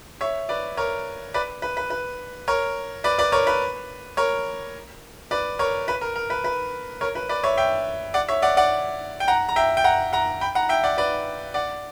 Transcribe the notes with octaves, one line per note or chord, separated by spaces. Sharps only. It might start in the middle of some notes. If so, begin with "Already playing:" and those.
C#5 E5
B4 D5
A#4 C#5
B4 D5
B4
B4
B4
A#4 C#5
B4 D5
B4 D5
A#4 C#5
B4
A#4 C#5
B4 D5
A#4 C#5
B4
A#4
A#4
B4
B4
A#4 C#5
B4
B4 D5
C#5 E5
E5 G5
D5 F#5
C#5 E5
D5 F#5
D5 F#5
G5
F#5 A#5
A#5
E5 G5
G5
F#5 A#5
F#5 A#5
G5 B5
F#5 A#5
E5 G5
D5 F#5
B4 D5
D5 F#5